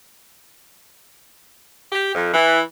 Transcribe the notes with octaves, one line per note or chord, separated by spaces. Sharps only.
G4
F2
E3